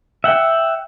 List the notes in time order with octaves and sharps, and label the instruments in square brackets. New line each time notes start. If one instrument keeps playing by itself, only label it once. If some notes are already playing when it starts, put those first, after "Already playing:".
[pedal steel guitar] E5 F#5 G5